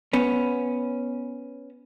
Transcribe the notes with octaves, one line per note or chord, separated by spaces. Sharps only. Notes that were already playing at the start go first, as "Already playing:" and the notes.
B3 C#4